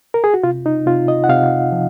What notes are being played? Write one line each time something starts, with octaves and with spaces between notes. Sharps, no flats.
A#4
G#4
F#4
C3 F4
D#4
C3 F4
D#5
F#5
C3 F5
F3